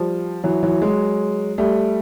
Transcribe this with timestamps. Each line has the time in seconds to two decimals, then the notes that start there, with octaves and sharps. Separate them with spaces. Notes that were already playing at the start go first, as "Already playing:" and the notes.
Already playing: F3 G3
0.44 E3 F#3
0.63 E3 F#3
0.82 F#3 G#3
1.58 G3 A3